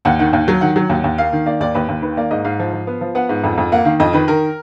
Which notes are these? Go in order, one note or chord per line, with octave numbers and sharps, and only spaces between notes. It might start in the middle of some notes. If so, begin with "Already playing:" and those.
D#2 F#5
D#3 F#5
D#2
F#3
D#3 F#5
F#3
D#2
D#2
A#3 F5
D#3
A#3 D5
D#2 D5
D#2 B4
D#2
D#3 B4
A#3 D5
G#2 D#5
G#2 F5
F3
F3
B3
F3
B3 F#5
G#2
F2
F2
A#3 F#5
D#3 F5
F2 D#5
D#3 B4
D#3 A#4